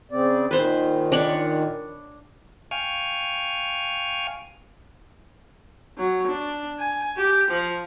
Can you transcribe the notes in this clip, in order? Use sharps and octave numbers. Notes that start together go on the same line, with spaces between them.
C#3 C4 D5
A#2 D#3 B4 C5
D4 C#5 B5
F5 G5 G#5 C#6 F6
F#3
D4
G#5
G4
F3